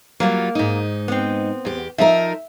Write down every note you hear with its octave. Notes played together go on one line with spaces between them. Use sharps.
F#3 G3 A#3 F4
G#2 D#4
B3 C4
E2 G4
F3 D#4 A#4 E5